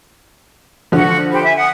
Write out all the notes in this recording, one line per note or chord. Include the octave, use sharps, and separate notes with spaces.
D3 F3 F#4 F#5
G4 C5 B5
E5 G#5
F#5 D#6